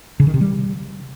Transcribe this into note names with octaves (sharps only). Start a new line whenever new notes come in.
C#3
D#3
C3
G3